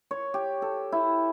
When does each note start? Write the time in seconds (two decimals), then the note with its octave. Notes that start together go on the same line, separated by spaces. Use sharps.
0.11 C#5
0.34 G4
0.62 A4
0.92 E4